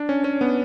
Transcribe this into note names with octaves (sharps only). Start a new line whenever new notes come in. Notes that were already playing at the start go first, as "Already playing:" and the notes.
Already playing: D4
C#4
C#4
B3